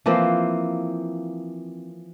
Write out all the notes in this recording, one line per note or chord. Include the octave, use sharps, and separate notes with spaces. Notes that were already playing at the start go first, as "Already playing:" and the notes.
E3 F3 A#3 C4